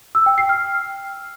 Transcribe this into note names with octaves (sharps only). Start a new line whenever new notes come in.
E6
G5
C7
F6